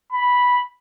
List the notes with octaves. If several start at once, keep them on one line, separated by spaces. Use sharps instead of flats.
B5